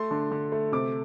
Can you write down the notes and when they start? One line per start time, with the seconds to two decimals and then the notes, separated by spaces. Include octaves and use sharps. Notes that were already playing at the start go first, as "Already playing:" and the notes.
Already playing: A3 C6
0.11 D3
0.32 D3
0.52 A3
0.72 C3 D6